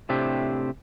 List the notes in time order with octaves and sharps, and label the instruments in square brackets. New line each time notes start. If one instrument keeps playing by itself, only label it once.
[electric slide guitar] A2 C3 C4 D4 G4